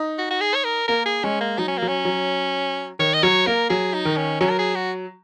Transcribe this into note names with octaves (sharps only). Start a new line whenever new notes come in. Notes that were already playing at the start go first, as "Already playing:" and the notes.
Already playing: D#4
F#4
F#4
G#4
C#5
A#4
A#3 A#4
G#4
G#3 C#4
A#3
F#3 D#4
C#4
A#3
F#3
C#4
F#3
D#3 C#5
D#5
F#3 C#5
A#3 A#4
F#3 G#4
D#4
D#3
C#4
F#3 C#4
A#4
G#4
F#4